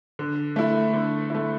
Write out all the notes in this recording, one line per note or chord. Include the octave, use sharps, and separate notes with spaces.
D3
A3 E4
D3
A3 E4